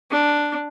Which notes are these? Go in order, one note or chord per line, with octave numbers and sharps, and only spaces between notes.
D4